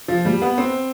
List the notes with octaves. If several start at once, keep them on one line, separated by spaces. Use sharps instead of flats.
F3
G3
B3
C4